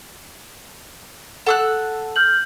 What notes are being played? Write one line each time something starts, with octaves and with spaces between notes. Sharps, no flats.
A4 F#5 E6 F#6
F6 G6 F#7